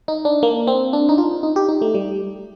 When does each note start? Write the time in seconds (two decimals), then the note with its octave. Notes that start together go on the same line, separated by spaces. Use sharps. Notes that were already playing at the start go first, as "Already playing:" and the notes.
0.08 D#4
0.25 D4
0.43 A#3
0.67 C4
0.93 D4
1.09 D#4
1.18 F4
1.43 D#4
1.56 G4
1.69 D#4
1.82 A3
1.95 G3